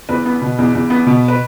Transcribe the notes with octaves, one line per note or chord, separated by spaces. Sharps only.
E2 B4
B3
B2
E2
E2
B3
B2
B4